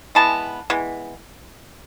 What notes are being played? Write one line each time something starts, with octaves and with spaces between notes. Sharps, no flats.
E3 G#3 B3 A5
E3 G#3 B3